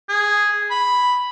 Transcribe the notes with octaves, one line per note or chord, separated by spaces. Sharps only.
G#4
B5